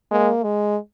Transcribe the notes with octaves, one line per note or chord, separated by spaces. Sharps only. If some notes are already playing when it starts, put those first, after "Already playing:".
G#3 A#3
G#3